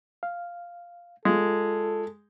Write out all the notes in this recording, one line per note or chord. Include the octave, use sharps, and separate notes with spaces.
F5
G#3 F4 A4